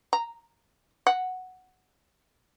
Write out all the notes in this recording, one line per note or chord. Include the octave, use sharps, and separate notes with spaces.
A#5
F#5